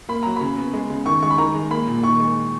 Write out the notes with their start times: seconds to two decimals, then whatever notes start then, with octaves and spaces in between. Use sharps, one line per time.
0.09 A#3 B5
0.23 F#3 A#5
0.36 C#3 B5
0.57 B3
0.73 G#3
0.90 C#3
1.06 D#3 C#6
1.22 G#3 C#6
1.30 B5
1.38 D#3 A#5
1.55 G#3
1.71 A#3 B5
1.87 A#2
2.03 D#3 C#6
2.20 G#3